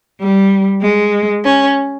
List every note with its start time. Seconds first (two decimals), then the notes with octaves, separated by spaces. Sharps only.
0.20 G3
0.83 G#3
1.45 C#4